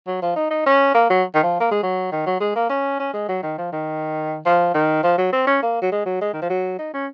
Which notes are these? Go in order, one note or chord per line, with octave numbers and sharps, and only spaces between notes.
F#3
F3
D#4
D#4
C#4
A#3
F#3
D#3
F3
A#3
G#3
F#3
D#3
F#3
G#3
A#3
C#4
C#4
G#3
F#3
D#3
F3
D#3
F3
D#3
F3
F#3
C4
C#4
A#3
F#3
G#3
F#3
G#3
D#3
F3
F#3
D#4
C#4